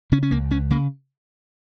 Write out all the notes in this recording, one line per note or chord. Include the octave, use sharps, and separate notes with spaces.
C#3 C#4
C#4
C#2 A#3
C#2 C#4
C#3 A#3